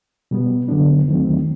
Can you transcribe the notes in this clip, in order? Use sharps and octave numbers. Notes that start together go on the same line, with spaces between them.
B2 G3 B3
F#2 D3 F#3 B3 D4
D#2 D#3 F#3 A3 C4